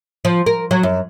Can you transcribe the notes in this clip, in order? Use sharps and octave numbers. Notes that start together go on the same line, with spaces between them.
F3
A#4
F#3
F#2